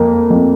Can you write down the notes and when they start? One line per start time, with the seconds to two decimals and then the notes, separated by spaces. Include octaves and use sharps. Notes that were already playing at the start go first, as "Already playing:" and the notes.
Already playing: F2 A#3
0.30 F2